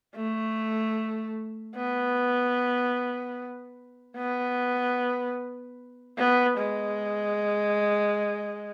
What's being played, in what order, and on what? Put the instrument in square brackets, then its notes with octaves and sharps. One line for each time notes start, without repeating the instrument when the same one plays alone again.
[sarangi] A3
B3
B3
B3
G#3